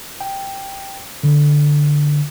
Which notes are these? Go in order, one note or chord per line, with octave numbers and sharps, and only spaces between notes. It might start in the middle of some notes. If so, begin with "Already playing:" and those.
G5
D3